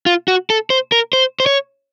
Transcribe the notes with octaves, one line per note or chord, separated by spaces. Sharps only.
F4
F#4
A4
C5
A#4
C5
C5
C#5